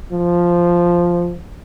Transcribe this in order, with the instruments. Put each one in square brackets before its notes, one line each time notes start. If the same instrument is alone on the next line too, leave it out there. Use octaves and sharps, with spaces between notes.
[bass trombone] F3